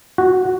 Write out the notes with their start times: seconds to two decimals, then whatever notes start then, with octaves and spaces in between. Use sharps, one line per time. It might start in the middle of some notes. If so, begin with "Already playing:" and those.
0.18 F#4